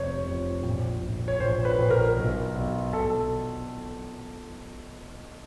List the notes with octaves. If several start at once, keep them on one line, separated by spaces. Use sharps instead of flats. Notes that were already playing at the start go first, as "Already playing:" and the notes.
Already playing: F1 F2 C3 C5 C#5
F2
A#1
A#1
C#5
A#1 C5
B4
A#1
A#4
B1
B1
B1 A4